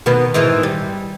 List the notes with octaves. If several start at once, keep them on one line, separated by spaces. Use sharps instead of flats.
B2 D#3 B3
G#2 D#3 E3
G3